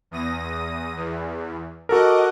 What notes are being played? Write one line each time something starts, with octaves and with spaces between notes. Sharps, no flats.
E2 D#6 A#6
E2
F#4 A4 A#4 D#5 F#5 D6